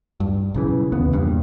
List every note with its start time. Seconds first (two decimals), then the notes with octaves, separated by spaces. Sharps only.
0.20 G2
0.54 B1 C#3 E3
0.92 D#2 C#3 B3
1.13 E2 G2 A#2